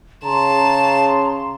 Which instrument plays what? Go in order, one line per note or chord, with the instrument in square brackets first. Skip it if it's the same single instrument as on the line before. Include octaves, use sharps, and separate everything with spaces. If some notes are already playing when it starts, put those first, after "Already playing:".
[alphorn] C#3 [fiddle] A5 [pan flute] A#5 [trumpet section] C6